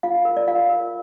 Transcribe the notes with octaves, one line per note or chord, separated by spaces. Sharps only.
F4 F5
A#4
D5
F4 F5
A#4